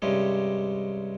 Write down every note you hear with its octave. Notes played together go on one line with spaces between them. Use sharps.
G2 C3 G#3 C#4